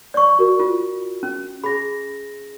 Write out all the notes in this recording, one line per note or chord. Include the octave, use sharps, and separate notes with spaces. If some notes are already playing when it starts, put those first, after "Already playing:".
D5 C#6
F#4 A#4
F4
C#4
G#4 B5 A#6